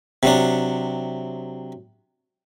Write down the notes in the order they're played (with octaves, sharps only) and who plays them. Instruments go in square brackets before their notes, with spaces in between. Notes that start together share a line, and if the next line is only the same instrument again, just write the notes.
[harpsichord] C3 F#3 D4